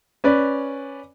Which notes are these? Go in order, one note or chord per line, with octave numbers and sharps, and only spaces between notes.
C#4 B4 D5